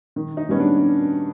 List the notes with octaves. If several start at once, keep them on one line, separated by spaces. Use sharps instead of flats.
D#3
D#4
G3 B3 C#4
D4